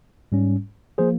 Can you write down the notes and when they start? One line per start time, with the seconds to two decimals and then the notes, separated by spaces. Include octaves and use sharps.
0.32 G#2 G3 C#4
0.98 F3 A#3 G#4 C5